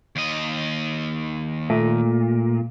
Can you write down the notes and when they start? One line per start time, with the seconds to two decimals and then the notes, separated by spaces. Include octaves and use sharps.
0.16 D#2 D#5
1.70 A#2 A3